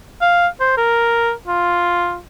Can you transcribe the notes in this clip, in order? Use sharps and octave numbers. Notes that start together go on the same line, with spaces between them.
F5
C5
A#4
F4